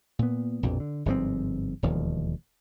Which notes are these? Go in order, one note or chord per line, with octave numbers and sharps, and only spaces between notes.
A#2 B3
A#1 F2 B2
D3
G1 G#2 F3 C4
E1 D#2 F3